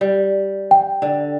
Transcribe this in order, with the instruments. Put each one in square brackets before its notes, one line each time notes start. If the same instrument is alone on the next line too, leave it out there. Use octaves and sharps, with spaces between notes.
[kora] G3
[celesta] G5
[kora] D3